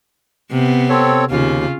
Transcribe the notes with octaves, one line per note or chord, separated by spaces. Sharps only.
C3 B3
C4 A4 C#5
D#2 C#3 F4